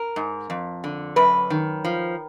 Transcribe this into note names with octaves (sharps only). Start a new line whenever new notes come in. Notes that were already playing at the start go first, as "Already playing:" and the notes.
Already playing: A#4
G#2
F2
D3
F#2 B4
D#3
F3